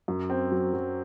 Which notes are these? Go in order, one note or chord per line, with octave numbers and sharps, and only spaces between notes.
F#2
C4
F#3
F#3